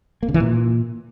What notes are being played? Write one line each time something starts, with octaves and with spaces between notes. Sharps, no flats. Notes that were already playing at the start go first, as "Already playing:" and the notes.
A#3
C#3
E3
A#2